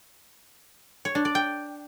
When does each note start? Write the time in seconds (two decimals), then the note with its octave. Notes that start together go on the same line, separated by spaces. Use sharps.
1.05 C#5
1.15 D4
1.25 D5
1.35 G5